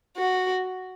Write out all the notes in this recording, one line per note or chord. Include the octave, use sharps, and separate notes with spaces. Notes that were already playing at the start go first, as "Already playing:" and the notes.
F#4